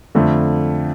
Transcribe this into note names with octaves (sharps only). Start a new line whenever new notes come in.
F2 D3 A3